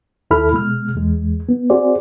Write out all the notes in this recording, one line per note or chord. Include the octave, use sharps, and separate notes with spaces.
D#2 E4 A4 B5 F6
B2 G#3 F6
E2 G#3
B3
C4 F#4 G#4 C5 D5